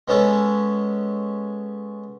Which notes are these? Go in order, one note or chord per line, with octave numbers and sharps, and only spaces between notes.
G#3 B3 C#4 A4